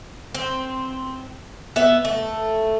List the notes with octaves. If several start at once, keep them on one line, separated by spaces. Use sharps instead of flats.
C4
B3 E5
A3